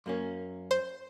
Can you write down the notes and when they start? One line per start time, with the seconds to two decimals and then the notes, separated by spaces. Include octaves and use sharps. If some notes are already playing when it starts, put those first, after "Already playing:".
0.06 F#2 A#3 C#4
0.71 C5